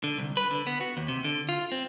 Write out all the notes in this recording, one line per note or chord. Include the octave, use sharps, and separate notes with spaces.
D3
C2
B4
D3
B3
F#4
D#2
C3
D3
F4
C4